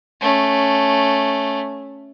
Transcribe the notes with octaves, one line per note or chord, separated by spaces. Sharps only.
A3 C#4